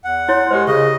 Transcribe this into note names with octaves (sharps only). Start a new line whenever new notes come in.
E2 F#5
E4 C#5 C6
G#3 G4 A#4 C5
C#3 G#4 D#5 C#6